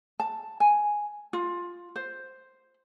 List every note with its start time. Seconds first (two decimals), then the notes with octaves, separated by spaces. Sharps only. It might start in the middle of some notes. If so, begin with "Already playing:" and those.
0.20 A5
0.60 G#5
1.33 F4
1.96 C5